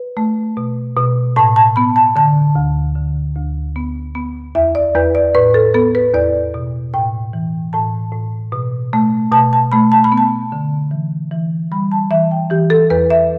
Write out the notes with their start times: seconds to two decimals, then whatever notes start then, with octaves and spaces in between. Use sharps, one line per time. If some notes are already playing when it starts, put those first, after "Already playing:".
Already playing: B4
0.17 A3
0.57 B2
0.97 B2
1.36 A2 A5
1.56 A5
1.76 B3 B5
1.96 A5
2.16 D3 A5
2.55 D2
2.95 D3
3.36 D2
3.76 B3
4.15 B3
4.55 E2 E5
4.75 D5
4.95 E2 B4
5.15 D5
5.35 A2 B4
5.54 A4
5.74 B3 A4
5.95 B4
6.14 E2 D5
6.54 B2
6.94 A2 G5
7.33 E3
7.73 A2 A5
8.12 A2
8.52 B2
8.93 A3
9.32 B2 A5
9.53 A5
9.72 A3 B5
9.92 A5
10.04 B5
10.12 B3
10.18 A5
10.52 D3
10.91 E3
11.31 E3
11.72 G3 B5
11.92 A5
12.11 E3 E5
12.31 G5
12.50 E3 G4
12.70 A4
12.90 E2 B4
13.10 E5